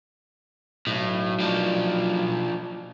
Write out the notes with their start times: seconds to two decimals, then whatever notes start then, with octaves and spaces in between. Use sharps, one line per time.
0.87 B1 A2
1.40 F3 D4